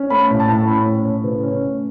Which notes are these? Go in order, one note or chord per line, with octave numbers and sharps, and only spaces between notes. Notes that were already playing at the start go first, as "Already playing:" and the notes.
Already playing: C#4
A3 B5
A2
A5
A2
C#4 B5
A3
C#5
A2
C#3 B4
C#4
A3